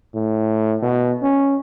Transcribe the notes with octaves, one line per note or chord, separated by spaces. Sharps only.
A2
B2
C#4